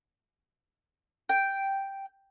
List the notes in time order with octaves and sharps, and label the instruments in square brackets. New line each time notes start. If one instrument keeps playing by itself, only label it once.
[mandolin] G5